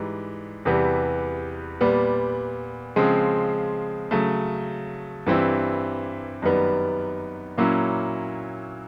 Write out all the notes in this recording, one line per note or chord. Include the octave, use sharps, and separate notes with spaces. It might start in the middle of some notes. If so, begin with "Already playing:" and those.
Already playing: G#2 E3 G3
E2 C3 E3 G3 B3
A#2 G3 B3
C#3 F3 G#3 C4
C#3 F#3 A3
G2 E3 G3 C4 E4
F#2 D#3 G3 B3
A#2 F#3 A#3 C#4 E4